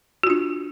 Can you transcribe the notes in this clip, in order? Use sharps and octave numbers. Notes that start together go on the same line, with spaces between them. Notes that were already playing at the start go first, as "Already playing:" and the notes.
D4 F4 F#4